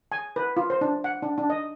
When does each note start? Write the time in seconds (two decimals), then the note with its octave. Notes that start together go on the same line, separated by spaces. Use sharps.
0.12 G#5
0.36 B4
0.57 F4
0.70 C5
0.81 D4
1.04 F#5
1.23 D4
1.38 D4
1.50 D#5